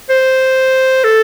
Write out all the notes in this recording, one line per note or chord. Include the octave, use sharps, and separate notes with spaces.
C5
A4